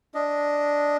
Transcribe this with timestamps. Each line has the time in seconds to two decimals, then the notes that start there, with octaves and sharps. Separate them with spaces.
0.14 D4 D#5